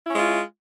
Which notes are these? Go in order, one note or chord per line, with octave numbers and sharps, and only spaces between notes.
G#3 C#4 E4 F4